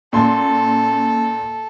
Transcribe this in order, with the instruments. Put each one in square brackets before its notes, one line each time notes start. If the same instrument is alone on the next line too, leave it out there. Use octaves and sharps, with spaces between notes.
[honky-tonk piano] A#2 C6 [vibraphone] A#3 C#4 [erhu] A4